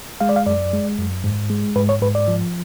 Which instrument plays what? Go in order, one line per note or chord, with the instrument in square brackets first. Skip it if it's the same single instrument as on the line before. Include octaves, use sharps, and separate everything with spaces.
[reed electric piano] G#3 F5
D5
F5
F#2 D5
G#3
F#2
G#2
G#3
G#2 B4
C#5
G#2 B4
D5
F3